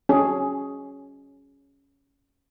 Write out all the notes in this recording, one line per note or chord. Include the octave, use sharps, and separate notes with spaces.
C#4 G#4